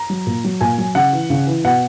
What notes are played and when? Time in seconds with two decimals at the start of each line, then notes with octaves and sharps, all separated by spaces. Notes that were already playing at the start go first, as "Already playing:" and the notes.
Already playing: A#5
0.10 F#3
0.26 A#2
0.44 F#3
0.61 A#2 G#5
0.78 F#3
0.95 C#3 F#5
1.13 E3
1.30 C#3
1.47 E3
1.65 B2 F#5